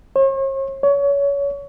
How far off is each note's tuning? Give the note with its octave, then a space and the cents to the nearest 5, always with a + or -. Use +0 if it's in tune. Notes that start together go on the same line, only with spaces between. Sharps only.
C#5 -45
C#5 +25